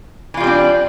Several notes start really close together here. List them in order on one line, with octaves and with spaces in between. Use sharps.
E3 F4 G3 C4 D4